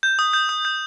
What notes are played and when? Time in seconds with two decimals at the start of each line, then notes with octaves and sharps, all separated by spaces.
0.03 G6
0.19 D#6
0.34 G6
0.49 D#6
0.65 G6